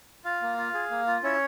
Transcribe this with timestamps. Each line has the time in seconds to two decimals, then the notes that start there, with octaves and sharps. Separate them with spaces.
0.25 F4 F5
0.42 A#3
0.58 F4
0.74 G#4
0.91 A#3
1.07 F4
1.23 C#4 E4 C#5